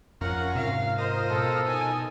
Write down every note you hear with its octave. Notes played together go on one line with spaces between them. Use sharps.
F2 C#4 F4 A#4 F#5
G#2 C3 C4 F5
F4 A#4 C5 D#5
B2 A4
D#4 G#5